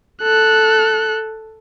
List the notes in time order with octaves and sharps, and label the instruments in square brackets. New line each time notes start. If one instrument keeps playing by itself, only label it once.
[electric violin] A4 F#6